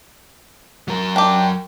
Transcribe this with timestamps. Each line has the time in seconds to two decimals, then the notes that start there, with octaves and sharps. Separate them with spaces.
0.88 F#3 A#4
1.16 D4 G4 G5